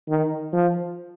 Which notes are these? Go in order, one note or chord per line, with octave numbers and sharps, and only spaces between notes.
D#3
F3